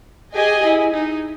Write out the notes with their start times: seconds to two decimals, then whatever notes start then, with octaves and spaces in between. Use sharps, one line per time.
0.34 G4 G#4 D#5 G#5
0.63 E4
0.94 D#4